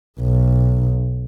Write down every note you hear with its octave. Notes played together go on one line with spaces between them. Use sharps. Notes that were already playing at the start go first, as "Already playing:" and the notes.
B1